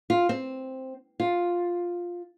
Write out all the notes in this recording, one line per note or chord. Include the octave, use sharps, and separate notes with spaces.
F4
C4
F4